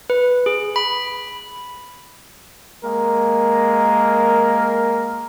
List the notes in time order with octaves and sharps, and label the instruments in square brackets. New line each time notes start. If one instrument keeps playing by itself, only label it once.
[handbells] B4
G#4
B5
[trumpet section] G#3 A#3 A#4